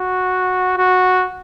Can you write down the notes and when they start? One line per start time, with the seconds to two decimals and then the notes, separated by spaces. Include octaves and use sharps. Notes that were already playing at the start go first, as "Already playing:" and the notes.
Already playing: F#4
0.78 F#4